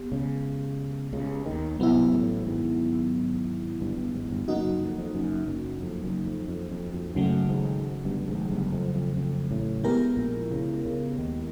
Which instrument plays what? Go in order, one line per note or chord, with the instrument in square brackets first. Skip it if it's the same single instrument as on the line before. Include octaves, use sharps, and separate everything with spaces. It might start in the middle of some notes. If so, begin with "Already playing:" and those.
Already playing: [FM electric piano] B3 G4
[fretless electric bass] C#2 C#3
C#2 C#3
D#2 D#3
[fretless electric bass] C2 C3 [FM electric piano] F#3 B3 E4
[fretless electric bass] A1 A2
G#1 G#2
G1 G2
G1 G2
G#1 G#2
G1 G2
[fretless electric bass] F#1 F#2 [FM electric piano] F#3 A#3 D#4 F#4
[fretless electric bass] F#1 F#2
F2
F2
F#1 F#2
F#1 F#2
F2
F#1 F#2
F2
F2
F2
F2
[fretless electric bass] F#1 F#2 [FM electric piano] C#3 F#3 A3
[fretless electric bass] G#1 G#2
G1 G2
G#1 G#2
G1 G2
F2
F2
F2
A1 A2
[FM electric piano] G#3 B3 E4 G4 A#4
[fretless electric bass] A#1 A#2
C#2 C#3
C#2 C#3
D#2 D#3